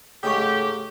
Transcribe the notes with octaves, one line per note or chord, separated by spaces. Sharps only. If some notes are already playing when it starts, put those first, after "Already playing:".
G#2 C#3 A3 D#4 G4 C#6 D#6